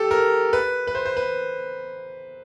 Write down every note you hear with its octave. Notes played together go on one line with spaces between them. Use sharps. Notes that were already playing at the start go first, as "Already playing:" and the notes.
Already playing: G4 A4
A#4
B4
B4
C5
C5
B4